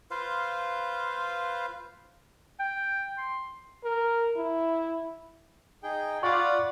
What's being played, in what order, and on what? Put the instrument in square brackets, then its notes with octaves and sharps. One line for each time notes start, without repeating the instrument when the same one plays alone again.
[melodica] F4 B4 C5 F5
[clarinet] G5
C6
[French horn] A#4
E4
[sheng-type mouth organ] D#4 G#4 G5
[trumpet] F4 [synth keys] D5 D6 [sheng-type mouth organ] F#5 B5 [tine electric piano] C#6